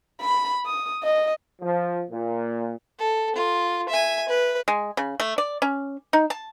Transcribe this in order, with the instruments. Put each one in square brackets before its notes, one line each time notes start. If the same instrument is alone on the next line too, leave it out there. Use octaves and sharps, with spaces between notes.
[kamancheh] B5
D#6
D#5
[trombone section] F3
A#2
[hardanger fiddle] A4
F4
E5 G#5
B4
[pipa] G#3
C#3
A3
D5
C#4
D#4
A5